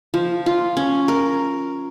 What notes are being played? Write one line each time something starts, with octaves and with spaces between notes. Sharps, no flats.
F3
F4
C#4
A#4